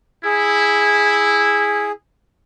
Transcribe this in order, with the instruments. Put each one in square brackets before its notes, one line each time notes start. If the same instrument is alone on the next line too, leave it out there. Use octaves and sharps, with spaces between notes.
[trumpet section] E4 [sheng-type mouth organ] G#4